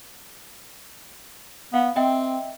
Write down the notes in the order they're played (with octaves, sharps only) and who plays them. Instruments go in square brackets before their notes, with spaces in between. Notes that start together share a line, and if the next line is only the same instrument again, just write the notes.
[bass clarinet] B3 [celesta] F5
[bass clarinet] C4 [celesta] D#5 E5 G5